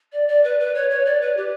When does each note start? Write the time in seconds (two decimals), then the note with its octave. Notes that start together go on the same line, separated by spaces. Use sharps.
0.13 D5
0.28 D5
0.44 B4
0.60 B4
0.75 C#5
0.90 C#5
1.06 D5
1.21 B4
1.37 G4